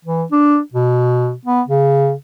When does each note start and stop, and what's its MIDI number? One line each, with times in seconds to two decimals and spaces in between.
0.05 0.24 52
0.32 0.59 62
0.74 1.33 47
1.45 1.61 59
1.68 2.13 49